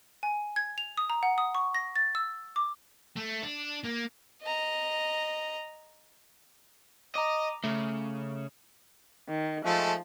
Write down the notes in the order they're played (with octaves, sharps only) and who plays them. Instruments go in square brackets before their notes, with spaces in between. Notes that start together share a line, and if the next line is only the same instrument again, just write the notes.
[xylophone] G#5
G#6
F7
D#6
A#5
F#5
D#6
C#6
A#6
A6
E6
D6
[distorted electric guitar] A3
D4
A#3
[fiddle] D#5 A#5
[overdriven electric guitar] D#5 [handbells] A#5 D6
[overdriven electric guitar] C#3 [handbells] A3
[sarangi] D#3
[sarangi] F3 [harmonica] G#3 A3